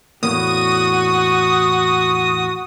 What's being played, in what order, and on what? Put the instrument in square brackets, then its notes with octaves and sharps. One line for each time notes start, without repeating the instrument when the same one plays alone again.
[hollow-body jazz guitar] E2 A2 A#3 [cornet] F#4 [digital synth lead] D#6